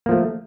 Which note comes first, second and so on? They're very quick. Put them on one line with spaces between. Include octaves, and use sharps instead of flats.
A#3 F3 A3